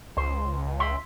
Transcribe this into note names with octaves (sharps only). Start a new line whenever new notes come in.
C#2 C5
E5 C6